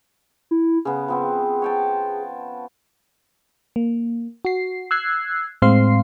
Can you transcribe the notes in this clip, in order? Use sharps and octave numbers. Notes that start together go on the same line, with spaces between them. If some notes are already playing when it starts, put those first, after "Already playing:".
E4
C#3 B3 G#4
F3 B3 C4
C#5 G5 A5
A#3
F#4 C7
E6 F#6 G#6 C7
A2 G#3 C4 F5 C6 C7